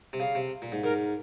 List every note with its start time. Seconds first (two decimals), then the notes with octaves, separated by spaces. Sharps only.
0.13 C3
0.20 C#3 F5
0.35 C3
0.62 A#2
0.72 G#2
0.83 G#2 A#4